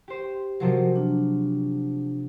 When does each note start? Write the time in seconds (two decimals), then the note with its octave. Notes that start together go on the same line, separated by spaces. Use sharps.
0.08 G4 C5
0.60 C3 F3 F#3 F#4 A#4 C5
0.96 D4